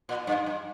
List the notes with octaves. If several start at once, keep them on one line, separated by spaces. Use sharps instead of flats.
A#2
G2
G2